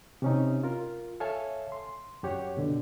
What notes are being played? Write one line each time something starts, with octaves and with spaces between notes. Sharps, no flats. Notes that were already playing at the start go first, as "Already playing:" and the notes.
C3 C#4 D#4
F4 A#4
A4 C#5 E5 F5 G#5 A5
C6
F#2 G4 C#5 F#5
B2 D3